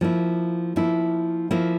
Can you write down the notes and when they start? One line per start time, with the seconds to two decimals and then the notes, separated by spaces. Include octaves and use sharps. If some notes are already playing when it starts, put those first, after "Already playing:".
0.01 F3 A#3 E4
0.76 F3 A#3 E4
1.51 F3 A#3 E4